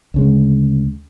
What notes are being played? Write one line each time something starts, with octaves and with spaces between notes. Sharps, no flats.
D2 C#3 G#3